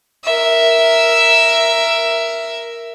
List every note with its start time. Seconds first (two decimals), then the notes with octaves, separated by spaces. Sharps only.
0.24 A#4 E5